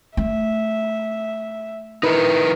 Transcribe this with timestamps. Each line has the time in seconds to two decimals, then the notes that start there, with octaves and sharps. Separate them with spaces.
0.17 A3 E5
2.03 D#4 E4 A#4 B4